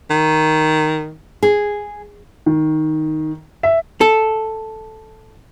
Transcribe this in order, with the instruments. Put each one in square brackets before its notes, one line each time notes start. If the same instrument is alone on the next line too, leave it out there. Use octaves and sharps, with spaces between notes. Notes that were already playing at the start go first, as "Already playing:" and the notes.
[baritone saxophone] D#3
[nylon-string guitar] G#4
[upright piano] D#3
E5
[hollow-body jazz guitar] A4